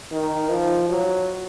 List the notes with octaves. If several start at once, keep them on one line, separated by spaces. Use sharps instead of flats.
D#3
F3
F#3